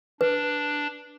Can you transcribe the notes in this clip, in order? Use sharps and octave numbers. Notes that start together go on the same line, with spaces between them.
D4 B4